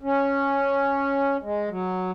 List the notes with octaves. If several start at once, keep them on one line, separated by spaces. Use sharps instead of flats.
C#4
G#3
F#3